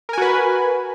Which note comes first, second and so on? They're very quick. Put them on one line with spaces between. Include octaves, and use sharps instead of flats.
A#4 G#5 F#4 B4